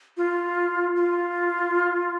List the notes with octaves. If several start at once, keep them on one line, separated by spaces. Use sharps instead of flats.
F4
F4